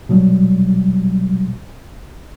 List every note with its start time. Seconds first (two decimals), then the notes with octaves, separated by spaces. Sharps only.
0.09 B2 F#3 G3